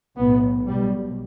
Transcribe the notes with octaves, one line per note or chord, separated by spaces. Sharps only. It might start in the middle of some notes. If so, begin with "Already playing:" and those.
B1 A2 B3
B1 B2 G3